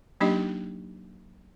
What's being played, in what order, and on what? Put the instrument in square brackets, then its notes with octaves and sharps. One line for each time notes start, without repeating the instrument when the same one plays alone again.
[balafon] F#3 A#3 D4 D#4 G4 D#5